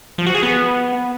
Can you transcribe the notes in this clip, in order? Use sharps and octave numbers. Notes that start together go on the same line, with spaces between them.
F3
F#4
G#4
B3